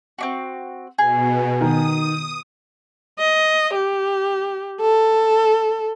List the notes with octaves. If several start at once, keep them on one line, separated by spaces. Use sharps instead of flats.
C4 D4 F#4
B2 G#4
D#3 D#6
D#5
G4
A4